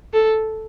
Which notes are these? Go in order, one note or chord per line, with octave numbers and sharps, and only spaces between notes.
A4